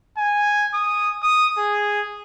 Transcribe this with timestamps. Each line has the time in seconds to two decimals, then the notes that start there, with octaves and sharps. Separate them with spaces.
0.18 G#5
0.74 D#6
1.23 D#6
1.58 G#4